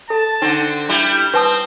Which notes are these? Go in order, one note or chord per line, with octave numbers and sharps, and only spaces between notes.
A4 A5
D3 C4 D#4
G3 E4 G6
C4 B4 A5 D#6